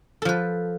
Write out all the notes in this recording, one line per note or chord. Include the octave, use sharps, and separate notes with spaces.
F3 A4 B4